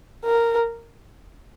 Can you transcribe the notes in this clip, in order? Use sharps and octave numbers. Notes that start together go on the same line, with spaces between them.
A#4